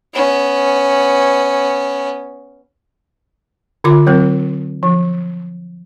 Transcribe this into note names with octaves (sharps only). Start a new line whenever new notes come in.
B3 C#4
D3 F4 D6
F#3 C4 A#4
F3